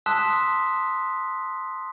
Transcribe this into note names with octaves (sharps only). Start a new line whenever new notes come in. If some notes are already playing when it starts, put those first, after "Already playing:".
A5 C6 D#6 E6 F#6 B6